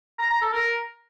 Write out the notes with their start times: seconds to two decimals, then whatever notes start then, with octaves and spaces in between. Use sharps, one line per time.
0.19 A#5
0.30 A#5
0.41 A4
0.53 A#4